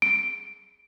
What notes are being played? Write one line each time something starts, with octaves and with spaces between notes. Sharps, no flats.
D7